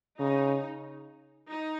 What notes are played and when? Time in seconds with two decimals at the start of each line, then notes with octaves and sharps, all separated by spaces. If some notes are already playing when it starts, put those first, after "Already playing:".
0.19 C#3 D#4
1.49 D#4